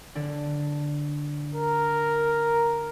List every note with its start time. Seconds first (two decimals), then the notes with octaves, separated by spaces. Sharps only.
0.15 D3 D4
1.55 A#4